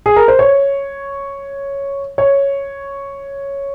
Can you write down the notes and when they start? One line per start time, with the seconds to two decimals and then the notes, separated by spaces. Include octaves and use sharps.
0.06 G#4
0.16 A#4
0.28 C5
0.39 C#5
2.18 C#5